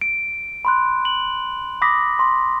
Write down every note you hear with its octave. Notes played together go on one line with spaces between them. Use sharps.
D7
B5 C6 F#6
F#7
B5 D6 D#6 A#6 B6
C6